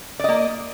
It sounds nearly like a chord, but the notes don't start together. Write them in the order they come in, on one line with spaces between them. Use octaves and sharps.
D5 D#5 A#3